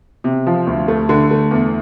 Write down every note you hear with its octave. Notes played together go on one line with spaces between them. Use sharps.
C3
F3
D2
A3
D3
A3
E2